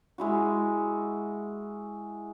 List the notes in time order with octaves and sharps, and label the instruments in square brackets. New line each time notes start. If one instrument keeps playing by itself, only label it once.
[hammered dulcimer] G#3 E4 F#4